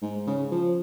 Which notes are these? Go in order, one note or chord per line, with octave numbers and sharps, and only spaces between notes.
G#2
C#3
F3